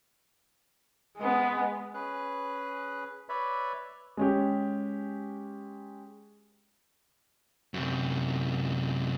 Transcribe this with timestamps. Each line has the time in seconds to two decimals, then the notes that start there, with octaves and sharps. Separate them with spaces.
1.18 G#3 B3
1.94 C#4 G#4 B4 F#6
3.29 B4 C#5 D5 E5 B5
4.17 G#3 C#4 G4
7.74 F#2 C3